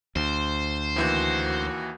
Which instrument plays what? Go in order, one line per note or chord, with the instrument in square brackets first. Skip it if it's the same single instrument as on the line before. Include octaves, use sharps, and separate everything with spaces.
[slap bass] D2 [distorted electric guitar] C5
[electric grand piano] D#2 E3 G6 [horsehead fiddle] A#3 F#4